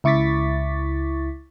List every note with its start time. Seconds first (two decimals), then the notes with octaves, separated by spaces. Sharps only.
0.04 C#2 E4 C#6 D6 A6 B6